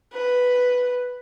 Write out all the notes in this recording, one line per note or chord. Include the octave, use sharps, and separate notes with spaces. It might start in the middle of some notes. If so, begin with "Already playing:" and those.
B4